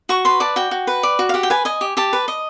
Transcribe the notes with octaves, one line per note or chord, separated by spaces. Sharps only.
F#4 C#6
B4 C6
D5 A5
F#4 G5
F#4
B4
D5
F#4
F5
G4 F#5
G5
B4 G#5
D#5 G#5
G4
G4 A5
B4
D#5